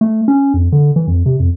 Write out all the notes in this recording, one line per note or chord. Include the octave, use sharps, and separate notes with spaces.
A3
C#4
F2
D3
E3
F2
C3
F2